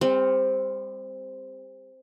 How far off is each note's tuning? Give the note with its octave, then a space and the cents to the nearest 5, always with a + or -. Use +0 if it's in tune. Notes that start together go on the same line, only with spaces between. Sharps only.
G3 +40 C4 +0